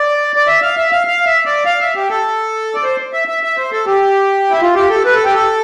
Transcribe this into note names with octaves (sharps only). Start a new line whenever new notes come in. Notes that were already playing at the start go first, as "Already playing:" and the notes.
Already playing: D5
D5
E5
F5
E5
F5
F5
E5
D5
F5
E5
G4
A4
D5
C5
E5
E5
E5
C5
A4
G4
E4
F4
G4
A4
B4
A4
G4
A4